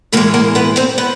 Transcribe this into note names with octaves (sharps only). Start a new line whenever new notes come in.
A2 E3 G#3 A#3 A#4
A#3 A#4
B3 B4
C4 C5
B3 B4